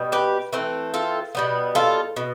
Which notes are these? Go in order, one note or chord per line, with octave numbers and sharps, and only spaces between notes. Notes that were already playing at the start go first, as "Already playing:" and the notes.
Already playing: B2 G3
G4 B4
E3 A3 C4
F4 A4
B2 G3 B3
F4 A4
B2